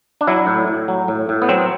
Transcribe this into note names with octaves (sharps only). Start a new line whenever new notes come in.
D4
F#3 E4
A2
A2
F#3
A2
A2
B3
F#3 C4